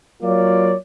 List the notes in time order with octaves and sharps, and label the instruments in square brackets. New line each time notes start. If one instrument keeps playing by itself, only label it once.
[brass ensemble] F#3 A#3 F4 C#5 D5